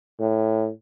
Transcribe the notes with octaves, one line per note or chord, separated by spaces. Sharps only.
A2